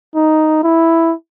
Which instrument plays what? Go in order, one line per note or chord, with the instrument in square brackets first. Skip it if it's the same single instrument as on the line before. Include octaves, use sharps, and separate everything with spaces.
[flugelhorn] D#4
E4